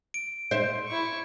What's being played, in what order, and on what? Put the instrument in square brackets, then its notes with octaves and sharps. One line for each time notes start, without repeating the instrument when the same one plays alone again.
[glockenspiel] D7
[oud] C5 E5
[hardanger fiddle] E4 C#6